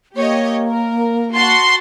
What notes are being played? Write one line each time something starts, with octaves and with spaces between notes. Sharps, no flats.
A#3 G4 C#5 D#5
A#4
F#4 A5 C6